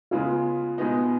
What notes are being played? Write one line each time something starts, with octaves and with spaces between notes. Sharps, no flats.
C#3 G#3 B3 F4
B2 G#3 B3 D#4